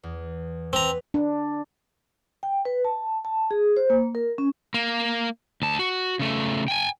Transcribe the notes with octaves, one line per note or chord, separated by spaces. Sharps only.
E2
C4 B4 A#5
D4
G5
B4
A5
A5
G#4
C5
A#3
A#4
C#4
A#3
D2 A5
F#4
C#3 A3
G5 G#5